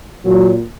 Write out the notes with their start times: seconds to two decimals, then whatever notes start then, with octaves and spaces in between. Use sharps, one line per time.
0.25 A#2 F#3